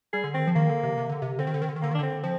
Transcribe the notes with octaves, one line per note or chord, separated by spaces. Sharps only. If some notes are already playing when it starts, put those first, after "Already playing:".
G3 G#4
D3
D#3 C4
F3
D#3 A#3
D3
C3
C3
D3
C3
D3 C4
D#3
D3
D#3
D3
D#3
D3 A#3
D#3
D4
D3 C4
F3 C4